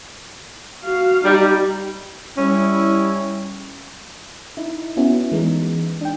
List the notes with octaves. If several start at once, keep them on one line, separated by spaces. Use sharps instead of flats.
F#4 F5
G3 D#4 G4
G3 C#4 E4
D#4 E4
B3 C#4 E4 F#4
E3 G#3 B3 D#4
D4 G5